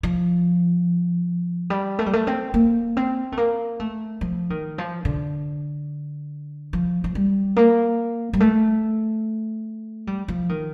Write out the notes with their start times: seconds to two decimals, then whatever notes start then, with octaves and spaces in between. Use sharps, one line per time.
0.03 F3
1.70 G3
1.99 A3
2.06 G3
2.13 A3
2.27 C4
2.54 A#3
2.97 C4
3.32 A3
3.37 A#3
3.80 A3
4.21 F3
4.50 D#3
4.78 F3
5.05 D3
6.73 F3
7.04 F3
7.15 G3
7.56 A#3
8.33 G3
8.40 A3
10.07 G3
10.28 F3
10.49 D#3